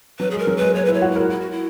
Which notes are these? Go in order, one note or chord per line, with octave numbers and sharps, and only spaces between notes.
F#3 B4
G#3 G#4
A#4
F#3
G#3 B4
A#3 C#5
B4
E4
C#5
F#4
E4
A#4
E4
F#4
E4